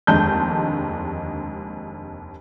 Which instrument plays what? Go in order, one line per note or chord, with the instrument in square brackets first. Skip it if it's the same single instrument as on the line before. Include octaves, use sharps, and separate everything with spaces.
[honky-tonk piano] F1 D#2 D3 G#3 A5 G6